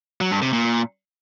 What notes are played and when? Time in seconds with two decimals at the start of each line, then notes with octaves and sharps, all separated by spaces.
0.21 F#3
0.31 G2
0.42 C3
0.53 A#2